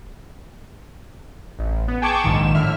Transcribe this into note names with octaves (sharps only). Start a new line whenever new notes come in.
A1
B3
G#4 G5 A5 C#6 D6 G#6
A#1 G#2 D#3 E7
A2 D3 E5 F6